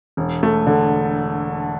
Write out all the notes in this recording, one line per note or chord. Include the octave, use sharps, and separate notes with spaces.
E1
A3
D3